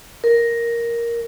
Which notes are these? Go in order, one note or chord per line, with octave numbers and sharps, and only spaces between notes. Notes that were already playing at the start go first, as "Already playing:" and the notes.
A#4